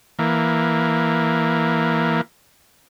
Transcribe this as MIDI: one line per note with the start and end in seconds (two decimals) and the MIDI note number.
0.19 2.21 52
0.19 2.21 58